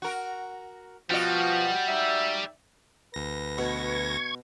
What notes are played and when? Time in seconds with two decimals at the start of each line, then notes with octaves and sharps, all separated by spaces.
0.02 F#4 A#4
1.10 B2 F3 G3 F#4 D#5
1.88 D#4 D5 E5
3.14 D2 B4 A#6
3.58 B2 C#6 G#6